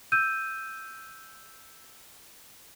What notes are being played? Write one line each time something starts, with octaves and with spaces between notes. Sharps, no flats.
E6 G6 D#7